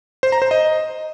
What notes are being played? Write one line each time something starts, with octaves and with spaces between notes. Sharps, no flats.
C5
A#5
C5
D#5